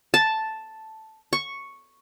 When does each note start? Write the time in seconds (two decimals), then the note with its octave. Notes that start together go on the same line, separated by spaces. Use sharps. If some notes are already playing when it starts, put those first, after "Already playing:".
0.14 A5
1.33 C#6